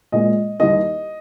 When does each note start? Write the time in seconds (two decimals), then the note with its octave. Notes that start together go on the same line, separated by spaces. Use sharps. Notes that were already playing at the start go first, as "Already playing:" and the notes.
0.12 A#2 G#3 D#5
0.60 D#2 D#3 G3 A#3 D#5